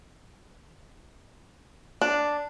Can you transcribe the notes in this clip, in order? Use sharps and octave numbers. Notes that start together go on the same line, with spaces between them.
D4